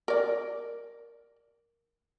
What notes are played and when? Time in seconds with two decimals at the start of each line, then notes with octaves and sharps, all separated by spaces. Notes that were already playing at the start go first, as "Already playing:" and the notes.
0.08 A#4 D5